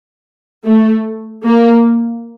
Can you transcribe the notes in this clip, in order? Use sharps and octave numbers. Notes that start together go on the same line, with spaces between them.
A3
A#3